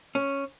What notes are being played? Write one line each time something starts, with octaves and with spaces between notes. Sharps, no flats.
C#4